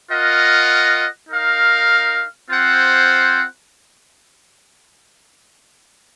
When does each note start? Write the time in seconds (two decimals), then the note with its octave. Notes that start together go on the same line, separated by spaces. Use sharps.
0.10 F4 A#4 D#5 F#5
1.29 D#4 A#4 F5
2.48 C4 F4 C5 F#5